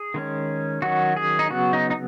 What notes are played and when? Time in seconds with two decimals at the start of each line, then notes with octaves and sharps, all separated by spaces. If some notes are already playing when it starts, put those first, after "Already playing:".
Already playing: G#4
0.14 D#3 G#3 C#4
0.82 D#3 F#3 C#4 F#4
1.17 G#4
1.39 D#4
1.50 C#3 F#3 B3 F#4
1.73 D#4
1.90 D#4